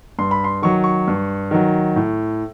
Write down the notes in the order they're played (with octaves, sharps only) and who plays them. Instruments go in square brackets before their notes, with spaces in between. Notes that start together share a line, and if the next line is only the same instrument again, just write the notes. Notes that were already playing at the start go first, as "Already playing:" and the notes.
[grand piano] G2 C6
B5
C6
D#3 F#3 C#6
C#6
G2
D#3 F#3
A2